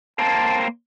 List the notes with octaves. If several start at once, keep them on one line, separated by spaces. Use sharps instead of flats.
A#3 C4 A5